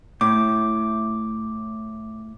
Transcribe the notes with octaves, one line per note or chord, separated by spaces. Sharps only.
A2 D6